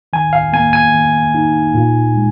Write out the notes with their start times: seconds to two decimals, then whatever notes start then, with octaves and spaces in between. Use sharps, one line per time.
0.13 D#3 G#5
0.33 F5
0.53 A#3 G#5
0.73 G#5
0.94 D#3
1.35 D#4
1.74 A#2
2.15 G#3